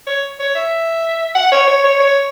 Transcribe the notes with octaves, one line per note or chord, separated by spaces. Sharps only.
C#5
C#5
E5
F#5
C#5
C#5
C#5
C#5